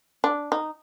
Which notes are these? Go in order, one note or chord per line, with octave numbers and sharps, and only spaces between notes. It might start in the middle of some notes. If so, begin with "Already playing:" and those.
D4
D#4